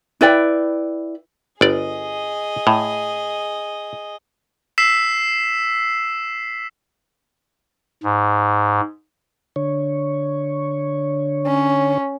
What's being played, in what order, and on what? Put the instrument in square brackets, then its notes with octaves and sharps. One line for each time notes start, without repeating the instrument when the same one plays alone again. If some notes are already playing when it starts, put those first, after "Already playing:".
[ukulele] E4 B4 D5 G5
[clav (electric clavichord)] G1 D5 [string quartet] G#4 D#5
[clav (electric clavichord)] A2
[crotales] E6 B6 C7 E7
[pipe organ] G#2
[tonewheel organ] D3 C#5
[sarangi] C#4